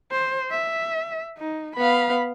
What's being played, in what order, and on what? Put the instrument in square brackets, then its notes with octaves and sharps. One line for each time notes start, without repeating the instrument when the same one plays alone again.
[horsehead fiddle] C5
E5
D#4
[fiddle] B3 F5 [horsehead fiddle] B5